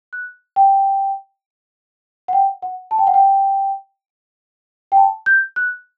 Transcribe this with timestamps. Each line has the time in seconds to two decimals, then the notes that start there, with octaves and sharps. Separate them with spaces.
0.13 F#6
0.56 G5
2.28 F#5
2.33 G5
2.62 F#5
2.91 A5
2.98 G5
3.07 F#5
3.14 G5
4.92 G5
4.97 A5
5.26 G6
5.56 F#6